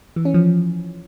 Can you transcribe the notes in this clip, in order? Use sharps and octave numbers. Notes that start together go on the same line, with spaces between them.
E3
C#4
F3